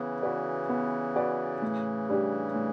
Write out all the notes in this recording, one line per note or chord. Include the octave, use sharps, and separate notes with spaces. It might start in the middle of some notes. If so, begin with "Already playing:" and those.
Already playing: C#3 E3 B3
F#4 B4 D5
B3
F#4 B4 D5
A2
G3 D4 G4
A2